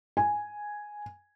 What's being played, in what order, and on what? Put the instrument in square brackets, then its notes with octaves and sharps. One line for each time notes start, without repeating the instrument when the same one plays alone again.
[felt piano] G#5